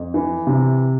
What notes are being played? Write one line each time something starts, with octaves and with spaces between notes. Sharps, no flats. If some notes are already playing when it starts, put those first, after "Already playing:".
Already playing: F2
E3
C3